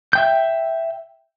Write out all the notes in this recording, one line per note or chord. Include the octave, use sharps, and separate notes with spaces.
E5 G5 G6